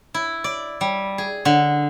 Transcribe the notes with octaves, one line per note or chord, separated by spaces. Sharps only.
E4
D5
G3
G#4
D3